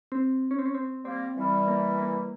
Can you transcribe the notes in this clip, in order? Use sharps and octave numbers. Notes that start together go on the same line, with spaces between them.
C4
C#4
C4
C#4
C4
G3 A#3 C4
E3 G3
A#3
A#3